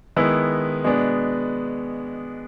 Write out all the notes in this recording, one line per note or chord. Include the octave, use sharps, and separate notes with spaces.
D#3 G#3 B3 E4
B2 G#3 B3 D4